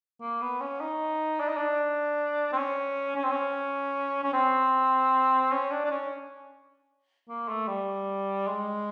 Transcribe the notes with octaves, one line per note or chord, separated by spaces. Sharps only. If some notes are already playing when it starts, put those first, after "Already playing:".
A#3
B3
C#4
D#4
D4
D#4
D4
C4
C#4
C#4
C4
C#4
C#4
C4
C#4
D4
D4
C#4
A#3
A3
G3
G#3